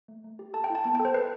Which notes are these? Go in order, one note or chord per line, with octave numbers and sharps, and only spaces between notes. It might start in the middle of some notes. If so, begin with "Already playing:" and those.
A3
A3
G4
A4 A5
G5
E4 A5
B3 A5
G5
A4
C5
A4 B4